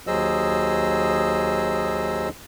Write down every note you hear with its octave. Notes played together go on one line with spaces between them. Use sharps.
D#2 F#3 G#4 C5 D#5 E6